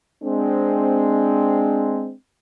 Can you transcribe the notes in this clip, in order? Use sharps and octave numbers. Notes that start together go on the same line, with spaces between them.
G#3 C4 D4